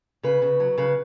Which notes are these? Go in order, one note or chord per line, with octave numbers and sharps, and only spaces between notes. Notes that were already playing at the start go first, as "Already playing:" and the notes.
C#3 B4
C#3
F#3
C#3 B4